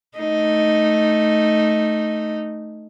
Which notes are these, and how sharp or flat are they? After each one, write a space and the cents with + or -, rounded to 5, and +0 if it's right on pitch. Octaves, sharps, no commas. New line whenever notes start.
A3 -5 D#4 +0